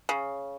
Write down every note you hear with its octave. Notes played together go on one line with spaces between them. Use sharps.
C#3